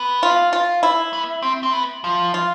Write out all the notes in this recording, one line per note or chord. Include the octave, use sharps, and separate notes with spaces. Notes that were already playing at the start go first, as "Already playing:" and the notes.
Already playing: B3
F4
F4
E4
B3
C4
C4
B3
F3
F4